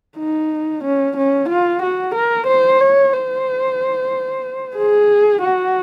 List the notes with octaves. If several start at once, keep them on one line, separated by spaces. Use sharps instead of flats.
D#4
C#4
C#4
F4
F#4
A#4
C5
C#5
C5
G#4
F#4